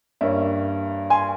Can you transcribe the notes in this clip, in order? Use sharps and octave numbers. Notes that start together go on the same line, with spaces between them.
G2 G3 A#3 C#4 E5
G#5 C6